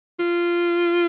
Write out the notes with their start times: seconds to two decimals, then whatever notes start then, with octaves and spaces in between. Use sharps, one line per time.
0.19 F4